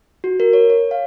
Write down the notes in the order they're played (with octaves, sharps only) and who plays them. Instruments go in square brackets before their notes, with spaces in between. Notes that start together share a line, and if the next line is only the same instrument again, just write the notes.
[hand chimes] F#4
A#4
C#5
C#5
F5